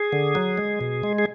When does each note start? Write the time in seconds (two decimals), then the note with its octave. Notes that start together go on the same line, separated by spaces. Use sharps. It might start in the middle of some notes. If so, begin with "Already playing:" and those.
Already playing: G#4
0.13 D3
0.35 F#3
0.58 G#3
0.81 B2
1.03 G#3
1.18 G#4